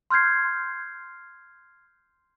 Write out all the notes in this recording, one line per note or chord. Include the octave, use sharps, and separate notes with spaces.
C6 F6 G6 G#6 C7